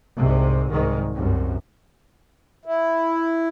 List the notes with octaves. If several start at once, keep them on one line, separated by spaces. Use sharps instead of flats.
C2 G#2 C3
C2 G#2 D#3
C2 F#2
E4